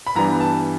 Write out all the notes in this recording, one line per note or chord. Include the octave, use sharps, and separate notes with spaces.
B5
G2 E3 G3 B3 A#5
A5